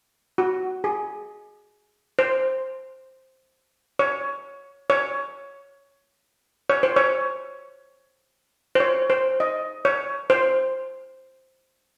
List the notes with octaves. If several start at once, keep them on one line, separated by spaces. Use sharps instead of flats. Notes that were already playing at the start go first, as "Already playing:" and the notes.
F#4
G#4
C5
C#5
C#5
C#5
C5
C#5
C5
C#5
C5
D#5
C#5
C5